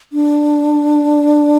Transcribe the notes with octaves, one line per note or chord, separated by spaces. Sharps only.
D4